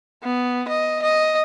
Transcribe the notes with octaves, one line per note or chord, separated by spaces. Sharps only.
B3
D#5
D#5